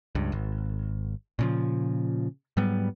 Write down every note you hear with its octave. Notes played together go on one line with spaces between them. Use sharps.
C#2 G2
G#1
A#2 C#3 F3
G#2 F#3 G3 B3